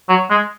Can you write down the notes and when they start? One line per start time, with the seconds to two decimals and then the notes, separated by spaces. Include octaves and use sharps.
0.09 F#3
0.30 G#3